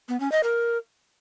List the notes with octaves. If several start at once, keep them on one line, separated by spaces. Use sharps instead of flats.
B3
C#4
D#5
A#4